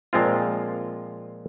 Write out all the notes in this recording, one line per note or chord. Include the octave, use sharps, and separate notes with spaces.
A#2 F3 G#3 C4 F4